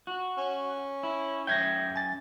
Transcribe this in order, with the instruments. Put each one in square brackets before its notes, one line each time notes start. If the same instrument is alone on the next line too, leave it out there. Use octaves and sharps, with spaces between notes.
[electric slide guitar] F#4
[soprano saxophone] C#4
[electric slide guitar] E4
[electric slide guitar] F#2 E5 G5 [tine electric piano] G6 G#6 A#6
[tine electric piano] G#5 A6